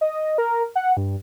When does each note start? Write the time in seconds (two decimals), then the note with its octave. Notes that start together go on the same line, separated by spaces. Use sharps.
0.01 D#5
0.38 A#4
0.75 F#5
0.97 G2